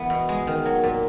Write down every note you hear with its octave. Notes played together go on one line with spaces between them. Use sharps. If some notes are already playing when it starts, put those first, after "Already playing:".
Already playing: E3 B3
B2
G#3
D#3
F#3
A#2